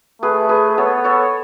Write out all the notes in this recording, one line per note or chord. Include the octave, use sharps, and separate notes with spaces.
A3 G#4 B4
G#4 B4
B3 A4 C#5
A4 C#5